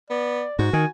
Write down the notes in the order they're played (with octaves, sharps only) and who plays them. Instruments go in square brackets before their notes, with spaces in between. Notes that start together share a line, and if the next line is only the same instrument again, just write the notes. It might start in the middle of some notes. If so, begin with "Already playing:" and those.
[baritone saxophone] B3 [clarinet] D5
[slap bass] G#2 [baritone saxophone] F#4
[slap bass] D#3 [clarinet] G#5